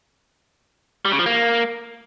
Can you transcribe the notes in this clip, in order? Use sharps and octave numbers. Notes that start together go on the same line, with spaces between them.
G3
C#3
F3
A#3